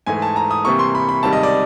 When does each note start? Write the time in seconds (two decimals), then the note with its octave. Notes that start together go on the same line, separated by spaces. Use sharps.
0.06 G#2 E3 A3 G#5
0.22 A5
0.36 A#5
0.51 D#6
0.65 C3 E3 G3 A#3 C#6
0.79 C6
0.95 B5
1.09 B5
1.23 C#2 C3 D#3 G3 A5
1.33 D#5
1.43 D5